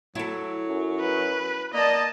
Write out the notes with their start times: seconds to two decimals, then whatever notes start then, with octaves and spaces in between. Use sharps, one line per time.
0.15 F#3 E4 A4
0.67 F#2
1.00 B4
1.74 A#3 D5 D#5 A5